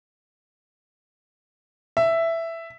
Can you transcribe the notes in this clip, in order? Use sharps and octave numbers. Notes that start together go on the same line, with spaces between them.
E5